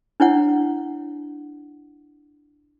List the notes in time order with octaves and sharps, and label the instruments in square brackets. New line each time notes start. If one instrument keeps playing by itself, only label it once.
[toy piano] D4 E4 C#5 F#5